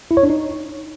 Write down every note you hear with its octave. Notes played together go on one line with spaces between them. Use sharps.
E4
C#5
D4
D#4